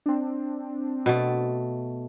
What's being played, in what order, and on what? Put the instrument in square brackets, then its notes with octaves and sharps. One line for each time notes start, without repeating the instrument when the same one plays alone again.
[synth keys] C4 D4
[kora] B2 A3